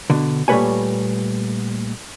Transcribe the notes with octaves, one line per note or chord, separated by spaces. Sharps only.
B2 D3
A#2 G3 A3 B4 C#5 G#5